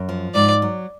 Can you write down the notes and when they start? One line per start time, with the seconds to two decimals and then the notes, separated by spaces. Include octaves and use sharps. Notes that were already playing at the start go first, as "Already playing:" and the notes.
Already playing: F#2
0.09 F3
0.35 G#2 D5
0.62 F#3